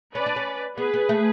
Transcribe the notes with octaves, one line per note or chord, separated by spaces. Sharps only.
C#4 B4 D5
D4
C#4
B3 G#4 B4
B3
A3